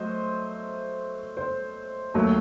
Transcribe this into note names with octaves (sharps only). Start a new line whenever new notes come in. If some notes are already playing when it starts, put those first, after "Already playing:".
Already playing: F#3 A3 C5 D#5
C5
D#2 D#3 F#3 A3